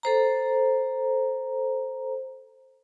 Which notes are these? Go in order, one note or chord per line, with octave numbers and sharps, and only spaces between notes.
A4 C5 A#5